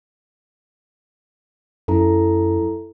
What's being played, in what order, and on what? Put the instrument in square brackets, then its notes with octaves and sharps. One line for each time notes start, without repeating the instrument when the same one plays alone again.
[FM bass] F#2 [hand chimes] E4 A4 A#5